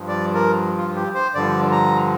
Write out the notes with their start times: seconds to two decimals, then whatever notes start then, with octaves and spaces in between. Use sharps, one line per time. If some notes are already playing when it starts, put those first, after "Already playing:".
Already playing: G2 F3
0.08 D5
0.34 A#4
0.78 F4
0.96 G4
1.14 C5
1.34 G2 D3 F3 D5
1.71 A#5